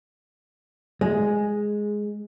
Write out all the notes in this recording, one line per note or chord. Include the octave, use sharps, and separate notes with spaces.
G#3